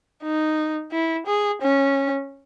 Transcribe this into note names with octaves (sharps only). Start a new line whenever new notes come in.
D#4
E4
G#4
C#4